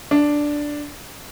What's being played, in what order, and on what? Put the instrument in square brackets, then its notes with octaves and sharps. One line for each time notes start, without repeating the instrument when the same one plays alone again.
[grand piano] D4